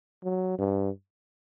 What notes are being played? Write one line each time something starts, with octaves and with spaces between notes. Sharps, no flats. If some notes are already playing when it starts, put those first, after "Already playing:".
F#3
G2